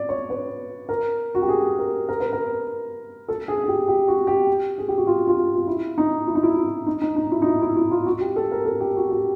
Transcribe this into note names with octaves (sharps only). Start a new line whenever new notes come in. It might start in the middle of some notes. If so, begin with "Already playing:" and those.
Already playing: D5
C#5
B4
A#4
F#4
G4
G#4
A#4
A#4
B4
A#4
A4
G#4
G#4
G4
G4
F#4
G4
G#4
G4
F#4
F4
F4
F4
E4
D#4
E4
D#4
E4
E4
D#4
D#4
D#4
E4
D#4
E4
E4
E4
F4
F#4
G4
A4
A#4
A4
G4
F#4
G4